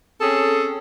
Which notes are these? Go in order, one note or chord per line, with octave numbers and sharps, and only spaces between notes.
C4 C#4 G#4 A4